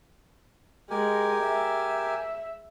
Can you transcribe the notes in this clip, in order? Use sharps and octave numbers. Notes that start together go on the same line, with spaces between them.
G#3 G4 A#4 G#5
E5